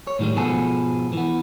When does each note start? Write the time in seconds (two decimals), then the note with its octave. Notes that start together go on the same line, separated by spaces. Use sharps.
0.07 C#5
0.19 A2 D#3 F3 G3 G#3
0.36 G#2 B2 F3 B3 G#4 A4
1.13 E3 B3